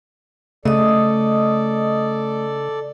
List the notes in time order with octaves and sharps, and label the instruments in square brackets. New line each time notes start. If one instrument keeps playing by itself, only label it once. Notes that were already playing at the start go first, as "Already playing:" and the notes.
[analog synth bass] C#3 [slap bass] A3 [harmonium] A4 D5 [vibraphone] D#5 D#6